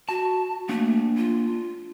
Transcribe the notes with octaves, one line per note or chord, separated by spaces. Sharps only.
F#4 A5
A3 A#3 D4
F4